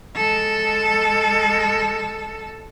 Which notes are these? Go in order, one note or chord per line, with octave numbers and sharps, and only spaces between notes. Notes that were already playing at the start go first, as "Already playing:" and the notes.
G#3 A4